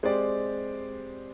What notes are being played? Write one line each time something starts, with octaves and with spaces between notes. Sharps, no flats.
G#3 C4 G4 D5